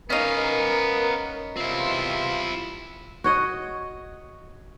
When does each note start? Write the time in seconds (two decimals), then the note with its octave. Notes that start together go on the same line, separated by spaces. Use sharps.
0.10 B3 C#4 D#4 A#4 F5
1.57 E2 C3 C4 E4 F4
3.24 F#4 C#5 D#5